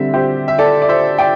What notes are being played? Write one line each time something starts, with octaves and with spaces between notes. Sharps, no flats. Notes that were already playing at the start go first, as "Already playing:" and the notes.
Already playing: D3 G3 C4 E5
G4 C5
E5
A4 D5
D5
C5 E5
D5 G5